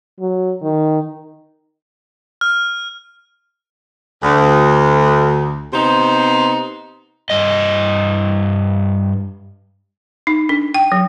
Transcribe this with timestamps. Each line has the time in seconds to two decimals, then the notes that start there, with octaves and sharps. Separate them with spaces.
0.20 F#3
0.62 D#3
2.41 F6
4.23 D2
5.73 C3 B3 D#4 C5
7.30 G2 D#5
10.27 D#4
10.49 D4
10.74 G5
10.92 F#3